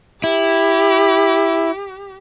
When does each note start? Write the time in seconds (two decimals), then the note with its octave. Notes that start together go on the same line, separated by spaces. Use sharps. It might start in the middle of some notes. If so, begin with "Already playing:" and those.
0.24 E4 G4